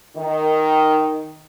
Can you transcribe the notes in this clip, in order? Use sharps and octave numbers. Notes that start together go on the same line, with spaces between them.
D#3